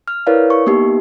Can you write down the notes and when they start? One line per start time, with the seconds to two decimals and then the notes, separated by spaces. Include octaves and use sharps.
0.08 F6
0.27 E4 A#4 B4 C#5 D5 F5
0.50 C#6
0.66 A#3 B3 D#4 G4